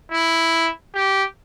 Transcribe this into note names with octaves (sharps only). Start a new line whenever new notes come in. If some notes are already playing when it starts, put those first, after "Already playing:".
E4
G4